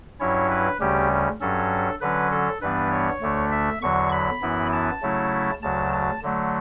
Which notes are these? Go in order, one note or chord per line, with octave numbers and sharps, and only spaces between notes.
G2 F#3 C#4 E4 C#5
B4
D2 C#3 G3 C#4 G4
G2 F#3 C#4 A4
D3 F#3 C#4 B4
A4
G2 E3 G3 B3 D4 B4
C#5
D2 D3 A3 D4
E5
E2 D3 F#3 C#6
B5
F#2 E3 B3 E4
A5
C#3 F#3 A3 C#4 E4
D2 C#3 F#3 A5
A5
D3 F#3 A3